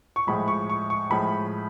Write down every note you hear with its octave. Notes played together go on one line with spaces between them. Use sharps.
C#6
A2 F3 G#3 B5
C#6
C#6
C#6
A2 F3 G#3 B5